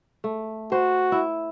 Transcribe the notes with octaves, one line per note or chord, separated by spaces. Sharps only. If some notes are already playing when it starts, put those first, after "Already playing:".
A3
F#4 C5
E4